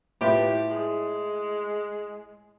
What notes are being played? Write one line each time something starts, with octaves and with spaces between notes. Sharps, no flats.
A2 B3 E4 F4 G4
G#3